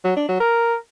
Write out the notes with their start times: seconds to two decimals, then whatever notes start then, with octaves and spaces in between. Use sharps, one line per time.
0.04 F#3
0.16 D4
0.28 F#3
0.40 A#4